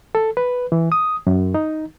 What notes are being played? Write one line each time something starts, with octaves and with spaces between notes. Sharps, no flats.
A4
B4
E3
D#6
F#2
D#4